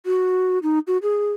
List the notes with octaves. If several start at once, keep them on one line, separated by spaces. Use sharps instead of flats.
F#4
D#4
F#4
G#4